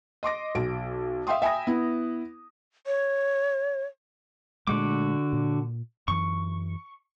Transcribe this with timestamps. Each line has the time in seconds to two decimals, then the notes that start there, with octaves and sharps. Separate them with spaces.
0.23 D#5 C6 D6 A#6
0.55 B1 D7
1.27 E5 F5 G5 C6 D#6
1.42 E5 G5 G#5 B5 D#6 A#6
1.67 B3 E4
2.86 C#5
4.67 A#2 D3 G#3 A3 F#4 D6
5.33 A#2
6.08 F#2 E3 C#6